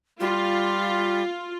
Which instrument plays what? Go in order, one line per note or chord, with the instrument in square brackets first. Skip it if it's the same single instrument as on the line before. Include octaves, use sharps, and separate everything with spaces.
[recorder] G3 [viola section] F4